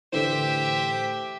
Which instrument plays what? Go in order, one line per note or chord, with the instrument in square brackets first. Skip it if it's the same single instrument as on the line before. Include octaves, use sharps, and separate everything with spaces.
[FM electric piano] A2 D3 E3 [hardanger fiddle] G4 E5 [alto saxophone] C5